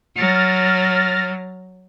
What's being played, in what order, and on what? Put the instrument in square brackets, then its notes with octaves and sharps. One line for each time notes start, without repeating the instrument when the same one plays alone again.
[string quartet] F#3 [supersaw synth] F6 A6 A#6